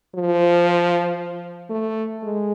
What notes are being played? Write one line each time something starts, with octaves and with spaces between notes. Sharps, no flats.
F3
A3
G#3